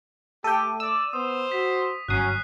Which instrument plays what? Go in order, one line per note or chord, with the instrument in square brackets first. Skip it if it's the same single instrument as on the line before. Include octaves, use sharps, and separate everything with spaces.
[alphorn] A3 [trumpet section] G4 [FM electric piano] A4 G5 [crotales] D#7
[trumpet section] D5 [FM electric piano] E6
[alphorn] B3 [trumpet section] C5 C6 [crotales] D#6
[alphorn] F#4 [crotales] B6
[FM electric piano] G1 D#6 [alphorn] F#3 [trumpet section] C#4 [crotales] F#6 C7